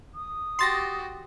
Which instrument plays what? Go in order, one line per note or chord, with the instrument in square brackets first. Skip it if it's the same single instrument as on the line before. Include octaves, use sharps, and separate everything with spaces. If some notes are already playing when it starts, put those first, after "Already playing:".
[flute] D#6
[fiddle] F#4 G4 [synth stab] C6 A6 A#6